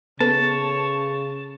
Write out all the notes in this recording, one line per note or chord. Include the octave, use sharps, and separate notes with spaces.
C#3 B3 A4 B4 C#5 A5